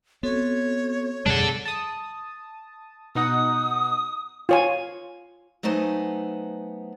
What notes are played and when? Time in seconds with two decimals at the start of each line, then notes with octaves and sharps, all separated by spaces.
0.23 B3 C4 F#4 A4 C#5
1.26 F2 B2 G3 D4 G#4 A4 A5
1.66 A5 D#6
3.15 B2 D#4 F#5 D#6
4.49 F4 C#5 G#5
5.63 F#3 A3 B3 D#4 C5 G#5